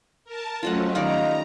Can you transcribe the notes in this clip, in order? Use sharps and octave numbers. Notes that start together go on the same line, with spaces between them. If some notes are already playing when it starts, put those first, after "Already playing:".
A#4 A5
F2 F#3 A3 C#4 F4 D#5 F#5
D#3 G3 D5 D#5 F5 A#5